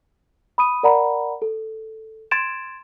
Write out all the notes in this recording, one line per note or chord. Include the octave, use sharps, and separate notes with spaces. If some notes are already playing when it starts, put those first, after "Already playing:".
B5 D#6 D#7
A#4 D5 F#5 A#5 B5
A4
C6 G#6 A6 D7 E7